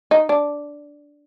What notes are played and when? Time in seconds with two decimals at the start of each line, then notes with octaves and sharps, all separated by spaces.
0.11 D#4
0.29 D4